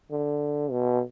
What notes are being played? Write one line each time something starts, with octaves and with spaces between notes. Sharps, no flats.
D3
B2